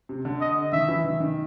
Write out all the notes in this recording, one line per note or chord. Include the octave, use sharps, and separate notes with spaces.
C3
D3
D#5
D#3 E5
E3
D#3
D#3